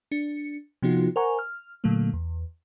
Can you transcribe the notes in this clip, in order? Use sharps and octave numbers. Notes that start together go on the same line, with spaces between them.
D4 C#7
C3 F3 B3 D#4 F4 F#4
A#4 C5 F#5 G#5 A#5 C#6
F6
A#2 D3 F#3 A3 A#3
E2